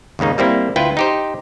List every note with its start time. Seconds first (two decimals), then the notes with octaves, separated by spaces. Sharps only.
0.19 D#2 G#2 C#3 A#3 D#4
0.38 G3 A#3 C4 E4
0.76 D2 E4 F4 B4 G5
0.97 D#4 G4 C5